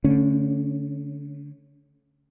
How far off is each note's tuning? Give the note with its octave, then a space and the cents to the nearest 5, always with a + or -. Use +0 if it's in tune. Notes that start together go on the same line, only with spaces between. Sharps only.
D3 -25 A3 +0 C#4 +0